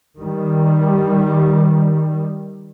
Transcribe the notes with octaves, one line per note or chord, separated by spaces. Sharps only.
D#3 G3